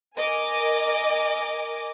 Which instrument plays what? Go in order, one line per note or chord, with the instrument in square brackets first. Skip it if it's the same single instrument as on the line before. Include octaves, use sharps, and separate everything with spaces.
[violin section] A#4 D#5 G#5 D6